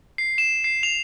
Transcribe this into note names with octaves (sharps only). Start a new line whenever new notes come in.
C7
E7
C7
F7